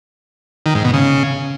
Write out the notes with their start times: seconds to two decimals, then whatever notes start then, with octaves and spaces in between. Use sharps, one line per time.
0.66 D#3
0.75 G#2
0.84 B2
0.94 C#3